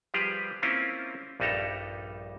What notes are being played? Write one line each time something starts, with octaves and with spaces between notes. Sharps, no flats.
F3 G3 G4 G#4 B4
A#3 C4 C#4 E4 F4
A#1 G2 G3 D#4 A4 A#5